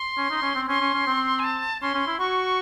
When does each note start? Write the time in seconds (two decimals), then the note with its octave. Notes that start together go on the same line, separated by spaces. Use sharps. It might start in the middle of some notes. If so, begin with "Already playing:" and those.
Already playing: C6
0.17 C#4
0.31 D#4
0.43 C#4
0.55 C4
0.69 C#4 C6
0.81 C#4
0.94 C#4
1.07 C4
1.39 G#5
1.44 A5
1.82 C#4 C6
1.94 C#4
2.07 E4
2.19 F#4 C#6